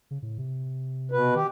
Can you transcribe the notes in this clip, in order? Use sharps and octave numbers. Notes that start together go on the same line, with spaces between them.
C#3
A2
C3
B2 B4
D#3 G4